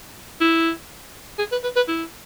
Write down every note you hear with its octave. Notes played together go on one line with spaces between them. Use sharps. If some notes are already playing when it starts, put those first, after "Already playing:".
E4
G#4
B4
B4
B4
E4